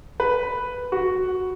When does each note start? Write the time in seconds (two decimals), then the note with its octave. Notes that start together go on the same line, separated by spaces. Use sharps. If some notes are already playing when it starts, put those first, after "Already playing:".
0.20 B4
0.92 F#4